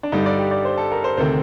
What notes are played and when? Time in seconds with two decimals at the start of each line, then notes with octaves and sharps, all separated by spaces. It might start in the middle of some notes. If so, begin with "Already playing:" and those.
0.03 D4
0.12 G2 D3 G3 D#4
0.26 D5
0.39 G4
0.51 D5
0.65 C5
0.77 A4
0.92 A#4
1.04 C5
1.17 D2 C3 D#3 A3 C4 C5